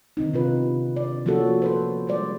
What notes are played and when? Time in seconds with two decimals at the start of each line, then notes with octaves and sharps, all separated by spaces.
0.17 D3 D#3 C4 D#4
0.34 C3 F4 B4
0.96 D5
1.26 F3 A#3 C#4 F#4 A4
1.62 A4 B4 C5
2.07 G3 G#3 C5 D5